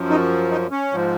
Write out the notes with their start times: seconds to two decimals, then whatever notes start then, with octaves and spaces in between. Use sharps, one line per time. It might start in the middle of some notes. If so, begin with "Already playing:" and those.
Already playing: F#2 F3
0.10 D#4
0.51 D#4
0.71 C#4
0.92 G#2 F3